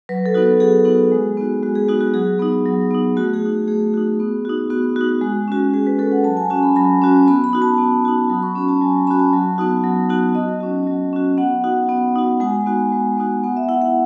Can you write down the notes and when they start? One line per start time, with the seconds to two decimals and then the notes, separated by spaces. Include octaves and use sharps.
0.09 F#3 B4
0.26 A4
0.34 B3 D#4 F#4
0.42 A4
0.60 F#3 G#4
0.85 B3 D#4 F#4
1.12 G#3
1.37 B3 D#4 F#4
1.63 G#3 F#4
1.76 G#4
1.88 B3 D#4 F#4
2.01 F#4
2.14 F#3 G#4
2.39 B3 D#4
2.65 F#3
2.91 B3 D#4
3.16 A3 F#4
3.34 G#4
3.42 D#4 F#4
3.67 A3 G#4
3.94 D#4 F#4
4.20 B3
4.45 D#4 F#4
4.70 B3 F#4
4.96 D#4 F#4
5.21 G#3
5.48 C#4 F#4
5.73 G#3 G#4
5.87 B4
5.99 C#4 F#4 A4
6.12 F#5
6.24 F#3 A5
6.37 G#5
6.50 C#4 F#4 G#5
6.63 B5
6.76 F#3 B5
7.02 C#4 F#4
7.27 B3 B5
7.44 B5
7.53 D#4 F#4
7.62 A5
7.78 B3
8.05 D#4 F#4
8.29 F#3 B5
8.42 C#6
8.55 C#4 F#4 B5
8.68 A5
8.81 F#3 G#5
9.07 C#4 F#4 B5
9.19 A5
9.33 F#3
9.58 B3 D#4 F#4
9.84 F#3
10.10 B3 D#4 F#4
10.35 F#3 D#5
10.61 C#4 F#4
10.87 F#3
11.13 C#4 F#4
11.37 B3 F#5
11.64 D#4 F#4
11.89 B3
12.15 D#4 F#4
12.40 G#3 G#5
12.66 B3 D#4 F#4
12.92 G#3
13.18 B3 D#4 F#4
13.43 B3 F#5
13.57 E5
13.69 E4 F#5
13.82 F#5